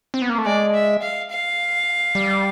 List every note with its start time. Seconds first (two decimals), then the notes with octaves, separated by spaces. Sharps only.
0.14 C4
0.22 B3
0.29 A#3
0.38 A3
0.45 G#3 D5
0.74 E5
1.02 F5
1.30 F5
2.15 G3